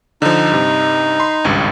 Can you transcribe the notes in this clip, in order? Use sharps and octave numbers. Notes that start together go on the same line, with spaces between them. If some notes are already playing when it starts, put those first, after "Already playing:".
D3 F3 D#4
G2 C3
B5 C6
G#1 C#2 G2